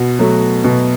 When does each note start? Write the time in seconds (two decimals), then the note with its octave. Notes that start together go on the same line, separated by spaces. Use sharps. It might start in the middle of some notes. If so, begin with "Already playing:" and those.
Already playing: B2 F#4
0.19 F#3 A3
0.64 B2